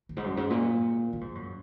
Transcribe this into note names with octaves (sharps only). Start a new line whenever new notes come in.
F#2
G#2
F#2
G#2
A#2
A#2
G#2
F#2